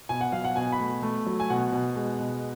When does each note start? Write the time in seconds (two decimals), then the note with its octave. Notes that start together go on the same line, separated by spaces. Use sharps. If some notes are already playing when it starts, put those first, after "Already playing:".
0.09 B2 G#5
0.21 F#5
0.32 F#3 F5
0.44 F#5
0.56 B2 G#5
0.72 B5
0.80 A3
1.02 A3
1.26 F#3
1.40 G#5
1.50 B2 F#5
1.72 B2
1.96 G#3
2.20 B2